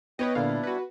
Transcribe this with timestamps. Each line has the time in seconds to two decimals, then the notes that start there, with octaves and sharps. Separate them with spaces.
0.19 B3 B4 C#5 D#5 G5
0.35 A#2 D3 G3 D4 E4 F5
0.63 F#4 B4